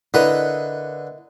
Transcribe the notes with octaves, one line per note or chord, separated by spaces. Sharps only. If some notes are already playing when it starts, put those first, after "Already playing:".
D3 E4 A#4 B4 D#5